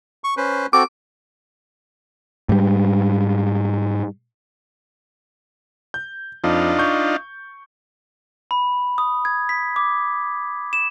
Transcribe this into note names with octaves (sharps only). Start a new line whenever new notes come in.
C#6
C#4 B4 C5
C4 F#4 A4 D6
G#2 G3
G6
F2 D4 D#4 F4
C#6 G6
B5
D#6
G#6
B6
D6
E7